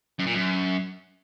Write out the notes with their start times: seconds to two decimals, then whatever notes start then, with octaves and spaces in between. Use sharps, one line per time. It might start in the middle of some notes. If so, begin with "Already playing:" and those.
0.19 F#2
0.27 A#2
0.34 F#2